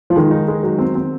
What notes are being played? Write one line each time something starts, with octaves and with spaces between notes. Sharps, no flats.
F3
D#3 G#3
D#4
G#3
F#3
C4
C4